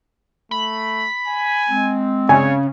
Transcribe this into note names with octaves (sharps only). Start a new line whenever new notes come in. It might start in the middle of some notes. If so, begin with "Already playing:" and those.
A3 B5
G#5
G#3 C4
C#3 C#5 G#5